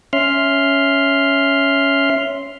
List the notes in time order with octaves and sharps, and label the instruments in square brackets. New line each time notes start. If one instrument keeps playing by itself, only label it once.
[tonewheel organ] C#4 E5 C6 F6